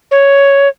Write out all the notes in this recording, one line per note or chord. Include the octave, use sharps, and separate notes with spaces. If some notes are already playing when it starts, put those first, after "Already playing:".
C#5